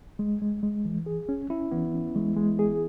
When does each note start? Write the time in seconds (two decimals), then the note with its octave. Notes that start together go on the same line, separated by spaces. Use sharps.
0.19 G#3
0.42 G#3
0.63 G#3
0.85 E3
1.06 G#4
1.29 C#4
1.50 C#4 E4
1.72 E3 B3
1.94 C#4
2.15 E3 G#3
2.37 G#3
2.59 G#4